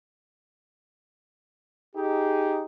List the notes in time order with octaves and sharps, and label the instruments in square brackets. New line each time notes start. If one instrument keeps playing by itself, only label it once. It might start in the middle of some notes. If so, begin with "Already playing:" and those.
[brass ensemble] D#4 G4 G#4